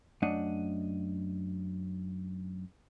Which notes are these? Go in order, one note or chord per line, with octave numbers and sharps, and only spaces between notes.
F#2 A3 D4 D#5 F#5